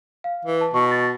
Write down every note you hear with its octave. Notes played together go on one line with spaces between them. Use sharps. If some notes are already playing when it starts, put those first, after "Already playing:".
F5
E3
A5
B2 A5 C#6
A6